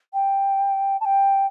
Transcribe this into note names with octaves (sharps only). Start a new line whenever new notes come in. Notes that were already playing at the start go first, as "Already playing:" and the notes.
G5
A5
G5